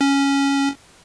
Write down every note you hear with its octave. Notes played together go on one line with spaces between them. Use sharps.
C#4